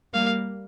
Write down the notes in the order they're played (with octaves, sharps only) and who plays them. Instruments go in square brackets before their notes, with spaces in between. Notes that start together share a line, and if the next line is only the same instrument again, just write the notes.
[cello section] G3 A#3 [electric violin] F5